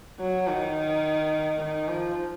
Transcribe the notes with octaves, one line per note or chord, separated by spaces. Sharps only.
F#3
D#3
D#3
F3